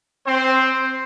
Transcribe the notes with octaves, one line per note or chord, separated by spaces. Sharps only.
C4 C5